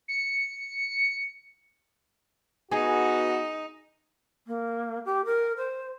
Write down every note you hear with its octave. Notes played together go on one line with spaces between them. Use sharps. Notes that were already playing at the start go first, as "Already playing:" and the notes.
C#7
B3 D#4 F#4 G#4
A#3
G4
A#4
C5